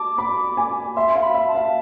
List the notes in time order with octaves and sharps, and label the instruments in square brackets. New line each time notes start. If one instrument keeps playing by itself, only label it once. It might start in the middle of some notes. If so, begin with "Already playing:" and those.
Already playing: [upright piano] A5 [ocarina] D6
[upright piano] B5
G#5
[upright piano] E5 [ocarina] C6
[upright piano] F5 [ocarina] C6
[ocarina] B5
[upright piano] E5
[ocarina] A5
[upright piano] F5